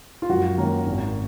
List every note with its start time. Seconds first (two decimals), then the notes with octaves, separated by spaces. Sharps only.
0.22 F4
0.29 F#2 F#4
0.57 D#3 A#3 C#4
0.86 G#1